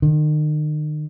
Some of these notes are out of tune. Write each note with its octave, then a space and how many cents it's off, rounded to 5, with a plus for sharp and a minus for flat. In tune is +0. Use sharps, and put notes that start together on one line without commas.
D#3 -40